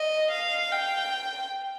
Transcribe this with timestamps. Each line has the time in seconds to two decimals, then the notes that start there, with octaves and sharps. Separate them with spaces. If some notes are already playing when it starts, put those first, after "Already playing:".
Already playing: D#5
0.32 F5
0.71 G5